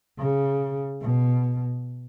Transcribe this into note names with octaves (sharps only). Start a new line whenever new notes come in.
C#3
B2